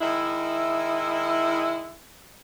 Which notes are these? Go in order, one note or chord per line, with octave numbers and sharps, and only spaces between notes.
D#3 G#3 E4